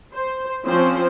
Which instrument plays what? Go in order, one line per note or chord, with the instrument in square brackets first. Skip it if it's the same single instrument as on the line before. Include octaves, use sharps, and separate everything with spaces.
[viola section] C5
F3 C4 C#4 C5